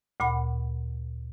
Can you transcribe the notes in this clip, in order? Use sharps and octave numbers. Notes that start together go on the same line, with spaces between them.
D2 A#2 F#5 B5